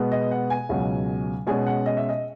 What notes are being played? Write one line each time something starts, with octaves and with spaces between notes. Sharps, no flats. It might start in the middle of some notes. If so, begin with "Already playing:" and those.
Already playing: B2 G#3 B3
D#5
F#5
G#5
C#2 B2 F#3
B2 G#3 C#4 G#5
F#5
D#5
E5
D#5